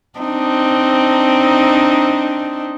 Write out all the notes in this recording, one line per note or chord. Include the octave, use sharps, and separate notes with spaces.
C4 D4 D#4